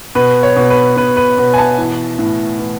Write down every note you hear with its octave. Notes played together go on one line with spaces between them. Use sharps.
B2 B4
C#5
B2
B4
B2 B4
B4
B2
G#5
A5
E3
A2
E3